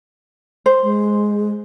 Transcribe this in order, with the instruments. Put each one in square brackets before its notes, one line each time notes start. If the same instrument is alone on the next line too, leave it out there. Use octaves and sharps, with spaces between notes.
[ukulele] C5
[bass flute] G#3